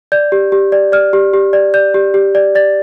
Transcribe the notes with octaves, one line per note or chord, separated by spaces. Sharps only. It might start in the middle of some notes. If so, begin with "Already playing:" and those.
D5 G6
G4
G4
D5
D5 F6
G4
G4
D5
D5 G6
G4
G4
D5
D5 A6